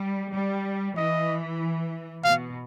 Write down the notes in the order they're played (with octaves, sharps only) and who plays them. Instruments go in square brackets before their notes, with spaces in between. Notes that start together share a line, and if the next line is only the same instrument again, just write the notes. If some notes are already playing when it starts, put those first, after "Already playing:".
Already playing: [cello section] G3
G3
[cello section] E3 [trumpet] D#5
[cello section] B2 [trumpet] F5